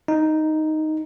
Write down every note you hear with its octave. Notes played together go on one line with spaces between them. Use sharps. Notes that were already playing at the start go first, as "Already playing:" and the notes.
D#4